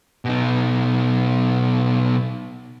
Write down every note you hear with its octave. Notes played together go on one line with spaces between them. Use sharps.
B2 D#4